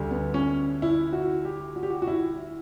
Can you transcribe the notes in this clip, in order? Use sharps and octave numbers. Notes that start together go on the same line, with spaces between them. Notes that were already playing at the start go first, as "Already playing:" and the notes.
Already playing: D2 D3 G3
B3
C#4
E4
F#4
G4
F#4
G4
F#4
F#4
E4